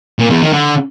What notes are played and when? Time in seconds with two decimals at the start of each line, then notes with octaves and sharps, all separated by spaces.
0.19 A#2
0.30 E2
0.42 D#3
0.53 D3